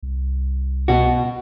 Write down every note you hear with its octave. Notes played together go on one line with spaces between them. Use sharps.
C2
B2 F#4